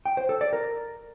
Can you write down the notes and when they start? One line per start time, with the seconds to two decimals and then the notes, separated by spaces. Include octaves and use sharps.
0.05 G5
0.17 C5
0.29 A4
0.41 D5
0.53 A#4